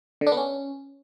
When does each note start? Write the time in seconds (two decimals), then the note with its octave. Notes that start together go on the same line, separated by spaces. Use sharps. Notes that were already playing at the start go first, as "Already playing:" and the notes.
0.21 D3
0.27 D4
0.32 B3
0.37 C#4